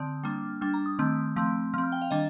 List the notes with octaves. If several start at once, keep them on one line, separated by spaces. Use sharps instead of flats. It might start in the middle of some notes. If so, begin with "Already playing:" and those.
Already playing: D3 C4 D#6
G3 A#3 D4 F6
G3 D4 F6
A#5
D#6
D#3 A3 C4
F3 A3 C4
F3 C4 F6
F6
G5
F5
D#3 G3 D4 D#5